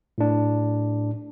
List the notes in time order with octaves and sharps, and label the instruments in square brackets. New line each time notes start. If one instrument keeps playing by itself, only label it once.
[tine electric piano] A2 D4